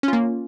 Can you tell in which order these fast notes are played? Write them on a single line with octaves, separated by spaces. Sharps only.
C#4 F4 A#3